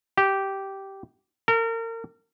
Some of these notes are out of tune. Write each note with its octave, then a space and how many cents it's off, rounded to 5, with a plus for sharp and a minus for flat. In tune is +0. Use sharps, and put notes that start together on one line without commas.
G4 -10
A#4 -35